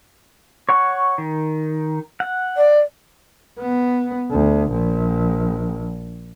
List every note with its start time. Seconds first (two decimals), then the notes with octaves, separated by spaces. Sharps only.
0.69 C#5 F#5 C#6
1.18 D#3
2.20 F#5
2.57 D5
3.59 B3
4.31 D2
4.71 A#1